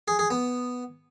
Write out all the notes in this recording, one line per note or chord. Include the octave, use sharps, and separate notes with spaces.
G#4
G#4
B3